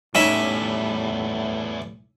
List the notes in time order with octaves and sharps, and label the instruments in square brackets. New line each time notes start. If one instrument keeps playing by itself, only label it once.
[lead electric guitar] E2 G3 [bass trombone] A2 [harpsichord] C#4 E4 E5 [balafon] D#4 D#5